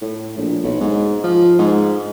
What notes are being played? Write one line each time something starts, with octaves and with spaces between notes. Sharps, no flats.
A2
A#1
B1
G#2
F3
G#2